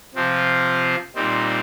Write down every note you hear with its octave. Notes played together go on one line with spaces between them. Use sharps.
C3 F3 C4 F4
A#2 G3 C4 D#4